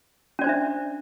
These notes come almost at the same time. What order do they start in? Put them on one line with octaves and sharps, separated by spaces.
C#4 D5 C5 D4 E5